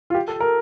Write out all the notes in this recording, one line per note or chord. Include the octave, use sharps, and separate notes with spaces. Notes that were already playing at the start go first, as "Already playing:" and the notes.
F4
G4
A4
A#4